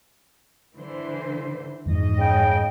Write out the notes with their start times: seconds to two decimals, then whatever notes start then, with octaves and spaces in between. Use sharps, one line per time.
0.75 D3 E3 C5
1.86 F2 G#2 E3 F3 D#5
2.18 C#3 G5